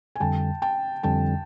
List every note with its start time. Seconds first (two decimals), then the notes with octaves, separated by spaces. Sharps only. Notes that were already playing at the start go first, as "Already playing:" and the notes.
0.16 G#5
0.20 F2 D3 G3 G5 A5
0.62 G5 A5
1.03 F2 D3 G3 G5 A5